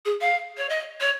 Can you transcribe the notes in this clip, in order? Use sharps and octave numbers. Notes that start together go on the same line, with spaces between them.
G#4
F5
C#5
D#5
C#5